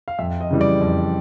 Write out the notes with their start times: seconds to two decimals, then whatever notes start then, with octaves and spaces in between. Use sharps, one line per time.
0.08 F5
0.19 F2 E5
0.41 D#5
0.50 C#3 E3 G3
0.61 D5
0.81 F2